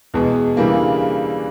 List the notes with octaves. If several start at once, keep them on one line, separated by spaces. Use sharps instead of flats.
E2 B2 G#3
C#3 E3 G3 A#3 D4